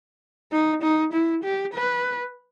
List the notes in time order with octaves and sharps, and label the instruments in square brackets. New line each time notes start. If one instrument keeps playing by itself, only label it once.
[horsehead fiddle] D#4
D#4
E4
G4
B4